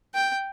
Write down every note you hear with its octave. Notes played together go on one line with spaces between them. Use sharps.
G5